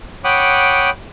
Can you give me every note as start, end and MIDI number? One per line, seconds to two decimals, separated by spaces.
0.24 0.90 73
0.24 0.90 78
0.24 0.90 79
0.24 0.90 83
0.24 0.90 86
0.24 0.90 87